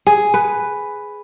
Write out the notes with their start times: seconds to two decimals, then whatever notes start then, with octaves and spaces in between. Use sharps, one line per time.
0.07 G#4
0.34 B4